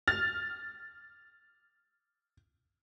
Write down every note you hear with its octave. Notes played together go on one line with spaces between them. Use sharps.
F6 A6